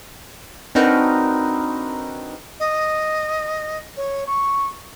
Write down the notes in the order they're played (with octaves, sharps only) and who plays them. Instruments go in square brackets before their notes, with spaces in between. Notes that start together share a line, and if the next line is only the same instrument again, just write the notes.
[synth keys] C4 D4 D#4 F#4 A#4 B4
[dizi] D#5
C#5
C#6